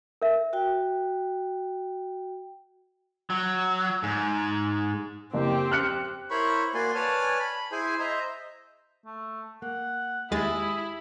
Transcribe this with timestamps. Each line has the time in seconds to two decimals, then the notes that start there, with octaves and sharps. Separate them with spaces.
0.22 A#4 E5
0.53 F#4 G5
3.30 F#3
4.03 G#2
5.34 F#1 C4 G4
5.72 F6 F#6 C#7
6.30 E4 A#4 C5 C#5 B5 C#6
6.74 A#3 F#4 D5 G#5 C6
6.95 B4 C#5 D5 G#5 A5 F6
7.40 B5
7.72 E4 G#4 C5 G#5
7.99 C5 D#5 E5 A#5
9.06 A3
9.62 A#3 F#5
10.31 D#2 G#3 E4 G4 G#4 E5 A6